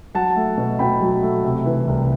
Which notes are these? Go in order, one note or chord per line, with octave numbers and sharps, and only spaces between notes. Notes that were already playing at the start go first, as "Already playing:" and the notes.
F#3 F#5 A5
A3
B2
B2 G5 B5
F#3
A3
C3
E3
C2